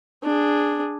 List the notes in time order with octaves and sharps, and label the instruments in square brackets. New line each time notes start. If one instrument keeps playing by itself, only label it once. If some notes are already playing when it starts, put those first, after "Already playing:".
[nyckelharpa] D4 G#4